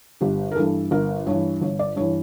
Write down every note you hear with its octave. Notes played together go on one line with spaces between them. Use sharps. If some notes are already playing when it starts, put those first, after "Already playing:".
G1 G4
A#4
G2 E3 A4
G1 A#4
G2 E3 C#5
G1 C#5
D5
G2 E3 C#5